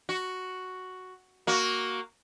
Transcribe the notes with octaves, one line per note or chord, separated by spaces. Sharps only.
F#4
A#3 F#4